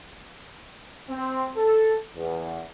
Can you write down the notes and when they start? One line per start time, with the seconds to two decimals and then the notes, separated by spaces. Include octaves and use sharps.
1.09 C4
1.57 A4
2.16 E2